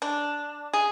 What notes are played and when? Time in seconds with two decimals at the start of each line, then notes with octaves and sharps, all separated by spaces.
0.02 D4
0.73 G#4